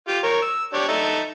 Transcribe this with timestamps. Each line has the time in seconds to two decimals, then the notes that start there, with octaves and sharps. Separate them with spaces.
0.08 F4 G4
0.24 A#4 C#5
0.42 E6
0.74 D4 G4 C#5
0.89 D#4 A4 E5